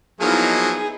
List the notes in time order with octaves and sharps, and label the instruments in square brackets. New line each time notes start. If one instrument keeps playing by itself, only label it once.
[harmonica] F3 F#3 A#3 [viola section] B3 D#4 E4 [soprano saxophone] G#4